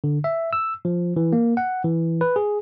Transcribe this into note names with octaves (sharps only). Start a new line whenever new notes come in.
D3
E5
E6
F3
E3
A#3
F#5
E3
B4
G#4